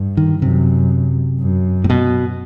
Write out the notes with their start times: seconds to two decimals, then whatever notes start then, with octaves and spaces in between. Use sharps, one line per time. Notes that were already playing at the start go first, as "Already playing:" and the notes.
Already playing: G2
0.17 D#3
0.41 F#2 C3
1.40 F#2
1.84 A2
1.90 B2